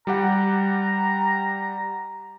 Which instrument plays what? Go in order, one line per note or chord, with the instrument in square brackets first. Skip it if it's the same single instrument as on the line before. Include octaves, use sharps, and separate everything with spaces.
[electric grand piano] G3 G4 F#5 [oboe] A#5